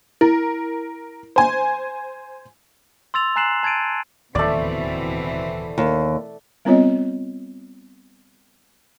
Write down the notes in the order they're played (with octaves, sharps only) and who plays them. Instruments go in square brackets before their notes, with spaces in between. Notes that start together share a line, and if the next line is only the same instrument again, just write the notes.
[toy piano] E4 [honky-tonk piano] A#4
[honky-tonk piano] C5 G#5
[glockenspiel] C6 E6 A6 F7
G#5 A#5 F#6 C7 E7 F#7
A5 G#6 A6 D7 D#7
[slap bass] D1 D#2 [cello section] B2 E3 C4 [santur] A3 D5
[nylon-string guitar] D#2
[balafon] G3 B3 C4 F4 C#5 D#5